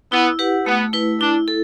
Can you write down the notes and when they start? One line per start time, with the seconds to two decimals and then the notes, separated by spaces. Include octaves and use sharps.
0.11 B3 E4
0.39 G4 B4 F#5
0.66 A3 B3
0.93 E4 B4
1.20 D4 E4
1.48 A4